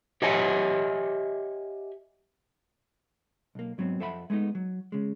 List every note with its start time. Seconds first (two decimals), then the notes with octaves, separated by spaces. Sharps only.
0.22 G4 C#5 D#5 E5 F#5 G#5
3.55 B1 A#3
3.78 G#2 F#3 B3 C4
4.00 F2 A4 C5 E5 F#5 B5
4.30 G#3 A3 B3 D#4
4.55 F#3
4.92 C#3 G#3